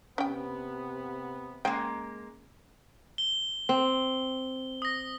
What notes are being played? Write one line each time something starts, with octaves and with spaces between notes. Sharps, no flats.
C3 B3 C#4 G5
C#3 G#3 A#3 G5
G7
C4
D#6 A#6